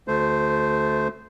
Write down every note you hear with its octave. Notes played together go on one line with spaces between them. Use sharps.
D2 A3 C5